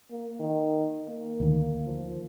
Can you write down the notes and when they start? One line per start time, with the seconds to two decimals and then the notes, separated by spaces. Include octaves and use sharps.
0.11 A#3
0.40 D#3
1.08 A#3
1.40 D2 D#3
1.86 F3